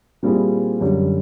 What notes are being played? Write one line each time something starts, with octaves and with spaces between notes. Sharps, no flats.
A#2 G3 C4 E4 G#4
F#2 D3 G3